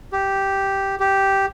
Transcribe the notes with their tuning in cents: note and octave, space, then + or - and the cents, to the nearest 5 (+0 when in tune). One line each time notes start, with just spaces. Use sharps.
G4 -5
G4 -5